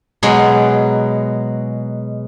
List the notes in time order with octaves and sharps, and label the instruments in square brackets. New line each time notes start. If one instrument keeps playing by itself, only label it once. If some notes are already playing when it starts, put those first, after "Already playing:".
[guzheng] B2 F#3 G#3